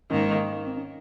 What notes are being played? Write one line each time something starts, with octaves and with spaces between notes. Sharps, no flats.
G#2 D#3 A#3 C#4
D#4
C4
C#4